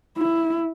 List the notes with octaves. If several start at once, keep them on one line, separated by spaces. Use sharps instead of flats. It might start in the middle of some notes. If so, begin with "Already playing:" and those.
E4